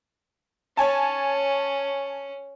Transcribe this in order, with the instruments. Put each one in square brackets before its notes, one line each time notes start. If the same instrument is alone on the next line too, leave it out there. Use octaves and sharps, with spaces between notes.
[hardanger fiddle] C#4 [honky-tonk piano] C#5 G#5 A5